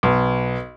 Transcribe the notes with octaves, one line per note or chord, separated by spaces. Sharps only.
B1